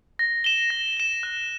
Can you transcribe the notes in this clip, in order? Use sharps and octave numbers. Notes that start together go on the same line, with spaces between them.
A#6
E7 G7
A#6
E7 G7
F#6